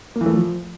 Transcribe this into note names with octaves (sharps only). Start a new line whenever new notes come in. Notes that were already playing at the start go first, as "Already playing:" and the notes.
A#3
E3
A3
F3